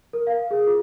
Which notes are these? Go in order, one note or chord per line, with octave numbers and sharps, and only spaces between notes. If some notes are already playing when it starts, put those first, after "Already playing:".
A#4
F5
G#4
F4